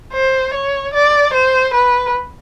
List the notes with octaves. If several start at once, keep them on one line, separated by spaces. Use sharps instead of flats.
C5
C#5
D5
C5
B4